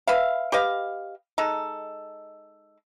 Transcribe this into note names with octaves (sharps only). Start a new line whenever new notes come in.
B4 E5 F5
G4 B4 D#5 F5
G#3 D#4 A4